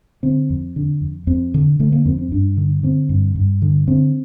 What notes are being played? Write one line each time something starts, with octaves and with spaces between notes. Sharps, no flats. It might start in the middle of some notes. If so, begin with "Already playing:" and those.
D3 C4
F2
D3
F2
F2 C4
D3
D3 A3
A#3
F2 C4
C4
G2 D4
D3
D3 C4
G2
G2
D3
D3 C4